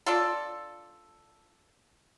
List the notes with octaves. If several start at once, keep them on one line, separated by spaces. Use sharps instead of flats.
D4 F4 A4